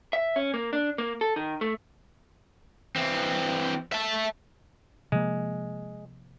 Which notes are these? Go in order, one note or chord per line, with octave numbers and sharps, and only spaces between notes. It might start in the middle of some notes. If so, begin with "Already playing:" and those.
E5
C#4
A#3
D4
A#3
A4
D#3
A3
E3 C4
E5 A5
C3 F3 G#3 A#3